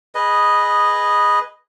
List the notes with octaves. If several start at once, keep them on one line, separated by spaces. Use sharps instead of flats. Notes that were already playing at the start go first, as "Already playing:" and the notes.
G#4 B4 D#5